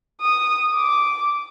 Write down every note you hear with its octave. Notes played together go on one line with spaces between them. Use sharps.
D#6
D6